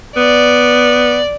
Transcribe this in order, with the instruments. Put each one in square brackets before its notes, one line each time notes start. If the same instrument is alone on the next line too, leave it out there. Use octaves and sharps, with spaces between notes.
[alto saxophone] B3 [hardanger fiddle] D5